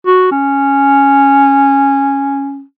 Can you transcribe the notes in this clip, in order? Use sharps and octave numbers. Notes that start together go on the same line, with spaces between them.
F#4
C#4